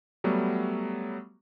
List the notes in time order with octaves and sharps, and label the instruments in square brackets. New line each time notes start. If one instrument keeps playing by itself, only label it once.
[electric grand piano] F#3 G3 A3 B3